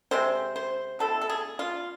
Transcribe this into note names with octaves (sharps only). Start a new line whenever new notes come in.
C3 G#3 C4 C5
C5
B2 A3 C4 E4 A4
A4
G#4
F4